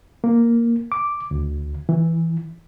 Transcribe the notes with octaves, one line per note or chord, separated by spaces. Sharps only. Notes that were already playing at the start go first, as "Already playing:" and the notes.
A#3
D6
D2
E3